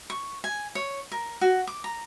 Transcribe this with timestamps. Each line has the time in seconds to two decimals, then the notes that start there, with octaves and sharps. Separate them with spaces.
0.10 C#6
0.44 G#5
0.75 C#5
1.12 A#4
1.41 F#4
1.67 D6
1.84 A#5